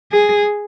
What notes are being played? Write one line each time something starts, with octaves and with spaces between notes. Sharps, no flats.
G#4